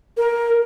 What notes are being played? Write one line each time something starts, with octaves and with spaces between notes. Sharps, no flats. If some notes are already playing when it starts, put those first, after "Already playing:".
A#4